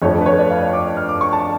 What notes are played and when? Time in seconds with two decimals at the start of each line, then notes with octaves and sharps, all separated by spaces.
0.02 F2 F3 A3 D4 C#5
0.14 A4
0.21 B4
0.26 C#5
0.38 D5
0.50 F5
0.73 D6
0.97 F6
1.09 D6
1.21 C#6
1.33 A5